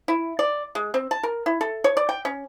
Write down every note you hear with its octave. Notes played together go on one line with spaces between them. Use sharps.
E4
D5
G#3
C4
A5
A#4
E4
A4
C#5
D5
G5
C#4